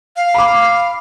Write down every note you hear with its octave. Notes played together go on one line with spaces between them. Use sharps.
F5
B5 D6